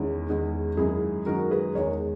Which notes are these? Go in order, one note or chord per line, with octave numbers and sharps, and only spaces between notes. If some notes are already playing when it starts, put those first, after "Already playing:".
Already playing: E2 D#3 G#3 C#4 E4
E2 D#3 G#3
F#2 D#3 G#3 E4 G#4
F#2 D#3 G#3 F#4 A#4
G#4 B4
E2 D#3 G#3 A#4 C#5